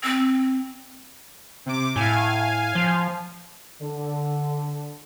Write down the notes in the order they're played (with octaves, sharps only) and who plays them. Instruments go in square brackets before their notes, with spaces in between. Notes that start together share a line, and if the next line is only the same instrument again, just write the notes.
[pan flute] C4
[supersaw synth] C3 D6
[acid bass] A2 [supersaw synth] F5 G#5
[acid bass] F3
[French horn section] D3